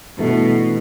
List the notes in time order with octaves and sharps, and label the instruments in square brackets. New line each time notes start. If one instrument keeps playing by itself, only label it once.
[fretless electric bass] G2 E3 A3 [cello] B2